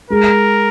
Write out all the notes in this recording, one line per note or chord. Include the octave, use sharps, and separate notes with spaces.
G#3 A#4